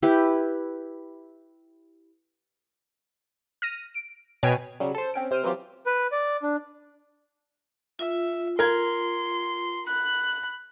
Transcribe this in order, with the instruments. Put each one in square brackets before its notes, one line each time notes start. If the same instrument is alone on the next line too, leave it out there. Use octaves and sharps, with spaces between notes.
[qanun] E4 G4 B4
[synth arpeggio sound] F6 A#6 D#7
D7
[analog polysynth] B2 [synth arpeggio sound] C#5 G5 G#5
[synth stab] C#3 F#3 G3
A4 C5
C4 C#4 D7
C3 C5 F6 D7 D#7
E3 F#3 C4 F4 G4
[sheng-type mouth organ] B4
D5
D4
[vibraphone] F4 [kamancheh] E5
[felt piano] A#4 G#6 [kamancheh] C6
[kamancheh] B5 F#6